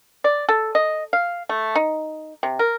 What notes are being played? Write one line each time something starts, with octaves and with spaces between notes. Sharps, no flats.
D5
A4
D#5
F5
A3
D#4
C3
A#4